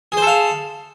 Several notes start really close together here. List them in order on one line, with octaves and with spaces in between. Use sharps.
G#4 C5 A4 F5